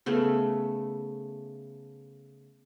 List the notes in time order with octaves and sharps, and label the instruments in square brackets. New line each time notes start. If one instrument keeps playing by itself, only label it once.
[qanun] C#3 A3 B3